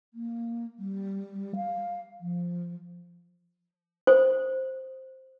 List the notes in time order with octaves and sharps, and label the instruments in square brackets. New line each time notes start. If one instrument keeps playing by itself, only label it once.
[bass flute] A#3
G3
F5
F3
[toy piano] C5